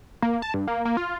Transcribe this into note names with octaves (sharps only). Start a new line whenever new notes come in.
A#3
A5
G2
A#3
A#3
F4